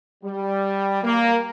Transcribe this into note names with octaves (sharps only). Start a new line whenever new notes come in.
G3
A#3